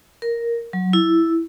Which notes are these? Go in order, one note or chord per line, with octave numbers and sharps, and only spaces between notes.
A#4
F#3
E4